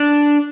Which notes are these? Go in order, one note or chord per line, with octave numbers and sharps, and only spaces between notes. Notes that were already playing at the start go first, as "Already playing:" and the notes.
Already playing: D4